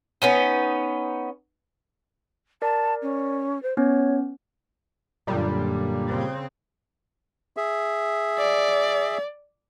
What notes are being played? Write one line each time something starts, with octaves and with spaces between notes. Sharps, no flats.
B3 C#4 D#4
A#4 D5 A5
C#4
C5
B3 C#4 C#5
F#2 A#2 D3 G3
C#3 C4
G#4 E5
D5